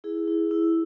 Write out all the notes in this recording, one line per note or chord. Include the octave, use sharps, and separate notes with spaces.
E4 G#4
E4
E4